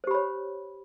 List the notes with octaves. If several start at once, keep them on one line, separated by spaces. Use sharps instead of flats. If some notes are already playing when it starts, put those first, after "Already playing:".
G4 C5 C#5 B5